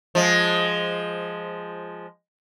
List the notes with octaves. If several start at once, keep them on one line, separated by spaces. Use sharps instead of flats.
F3 G#3